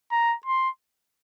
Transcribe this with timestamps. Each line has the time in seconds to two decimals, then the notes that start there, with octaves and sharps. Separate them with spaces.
0.12 A#5
0.46 C6